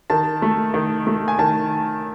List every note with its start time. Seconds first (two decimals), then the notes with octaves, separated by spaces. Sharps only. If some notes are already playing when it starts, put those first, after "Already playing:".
0.10 D#3 A5
0.42 A3
0.74 D#3
1.07 A3
1.28 G#5
1.39 D#3 A5